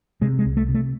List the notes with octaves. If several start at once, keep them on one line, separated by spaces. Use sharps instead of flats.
C3 G#3
G#3
C2
A3
C3
A3